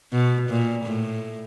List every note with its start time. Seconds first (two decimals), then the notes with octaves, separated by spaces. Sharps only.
0.12 B2
0.49 A#2
0.85 A2